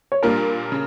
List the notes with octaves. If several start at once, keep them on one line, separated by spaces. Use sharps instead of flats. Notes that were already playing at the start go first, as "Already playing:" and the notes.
C#5
A#2 G3 A#3 D4 F4 A#4
C#3